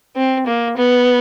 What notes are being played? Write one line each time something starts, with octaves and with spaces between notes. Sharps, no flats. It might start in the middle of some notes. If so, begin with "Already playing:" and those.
C4
A#3
B3